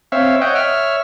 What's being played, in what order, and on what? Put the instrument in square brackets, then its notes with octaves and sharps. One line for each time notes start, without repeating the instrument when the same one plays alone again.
[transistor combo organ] C4 C#5 E5 F5
C#5 D#5 F#5 G5
C#5 E5 F6